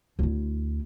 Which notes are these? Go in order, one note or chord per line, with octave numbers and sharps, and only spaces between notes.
D2 E4